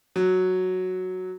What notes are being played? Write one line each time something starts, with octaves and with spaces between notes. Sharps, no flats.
F#3